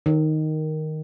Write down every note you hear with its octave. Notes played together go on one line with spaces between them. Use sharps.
D#3